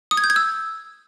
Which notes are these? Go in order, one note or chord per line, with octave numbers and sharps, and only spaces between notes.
D#6
G#6
G6
G#6
E6